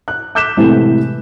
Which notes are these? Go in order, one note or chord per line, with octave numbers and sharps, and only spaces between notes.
F#6
D6 F#6 G6 B6 E7
A2 C3 E3 G#3 A3 B3